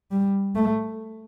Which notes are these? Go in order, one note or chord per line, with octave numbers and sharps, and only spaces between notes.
G3
A3